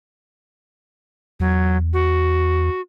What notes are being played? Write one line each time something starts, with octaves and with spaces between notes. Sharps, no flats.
E2 F#3
F#4